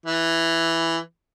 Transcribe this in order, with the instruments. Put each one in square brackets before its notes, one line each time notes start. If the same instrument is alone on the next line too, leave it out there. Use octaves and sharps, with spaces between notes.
[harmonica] E3